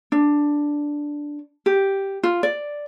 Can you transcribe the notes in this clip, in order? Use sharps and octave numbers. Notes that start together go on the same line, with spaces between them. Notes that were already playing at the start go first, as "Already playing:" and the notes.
D4
G4
F4
D5